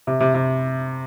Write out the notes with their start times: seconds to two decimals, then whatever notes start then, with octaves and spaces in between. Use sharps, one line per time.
0.07 C3
0.20 C3
0.34 C3